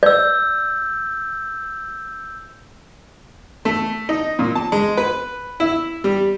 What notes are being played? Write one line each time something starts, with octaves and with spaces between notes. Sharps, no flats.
D5 E6 G6
A3
D#4
A#2
A5
G#3
B4
E4
G3